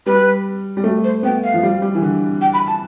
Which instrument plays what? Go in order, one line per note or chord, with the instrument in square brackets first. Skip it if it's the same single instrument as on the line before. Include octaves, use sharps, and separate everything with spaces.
[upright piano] G3 [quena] B4
[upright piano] G3
A3
[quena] C5
[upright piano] B3 [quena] G5
[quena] F5
[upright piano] F3
G3
G3
E3
D3
[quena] G5
B5
A5